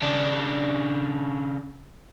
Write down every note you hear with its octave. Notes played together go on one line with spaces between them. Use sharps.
C#3 D4